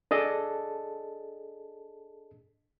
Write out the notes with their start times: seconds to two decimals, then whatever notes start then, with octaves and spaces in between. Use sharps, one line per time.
0.11 D4 G#4 A4 D#5 A5